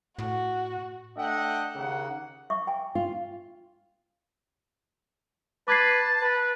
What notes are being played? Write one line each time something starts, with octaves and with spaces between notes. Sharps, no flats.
A2 F#4
A3 D4 D#5 E5 F#5 G5
D#2 C#3 A#3 F#5
E5 C#6 D6
G5 G#5
F4
B4 A5 D6 G#6 C7
B4